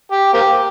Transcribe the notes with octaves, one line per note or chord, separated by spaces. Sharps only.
G4
A#3 C4 G4